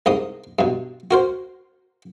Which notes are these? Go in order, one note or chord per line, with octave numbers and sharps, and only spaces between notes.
C2 G#2 D#5 D#6
G2 B2
F#4 A#4 C5